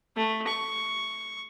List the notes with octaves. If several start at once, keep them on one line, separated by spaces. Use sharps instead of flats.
A3
C#6